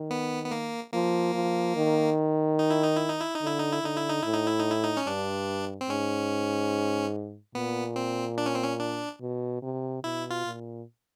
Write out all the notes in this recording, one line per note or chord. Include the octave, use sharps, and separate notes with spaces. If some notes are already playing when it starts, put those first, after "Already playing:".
Already playing: D#3
B3
B3
A#3
F3 A#3
F3
D#3
D#4
E4
D#4
E4
D#4
E4
D#4
D3 E4
D#4
E4
D3 D#4
E4
D#4
A2 E4
D#4
E4
D#4
E4
D#4
C#4
G2 D4
C4
G#2 C#4
A#2 B3
C4
D4
C#4
C4
C#4
D4
B2
C3
B2 E4
F4
A#2